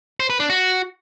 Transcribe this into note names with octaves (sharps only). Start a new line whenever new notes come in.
C5
B4
D4
F#4